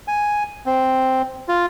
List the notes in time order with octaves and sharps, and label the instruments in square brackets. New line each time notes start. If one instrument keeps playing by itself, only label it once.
[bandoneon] G#5
C4
F4